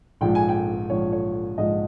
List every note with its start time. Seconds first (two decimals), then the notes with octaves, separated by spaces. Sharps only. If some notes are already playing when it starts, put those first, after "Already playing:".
0.21 A#1 G#2 F3 G5
0.35 G#5
0.49 G5
0.90 A#1 G#2 F3 C#5
1.12 C#5
1.58 A#1 G#2 F3 D#5